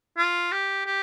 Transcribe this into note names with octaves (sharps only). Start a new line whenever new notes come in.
F4
G4
G4